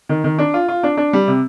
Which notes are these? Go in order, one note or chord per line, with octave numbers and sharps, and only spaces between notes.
D#3
D#3
D4
F4
F4
D4
D4
G3
C3